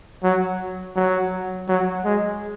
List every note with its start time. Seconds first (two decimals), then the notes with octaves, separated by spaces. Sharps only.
0.23 F#3
0.96 F#3
1.68 F#3
2.05 G#3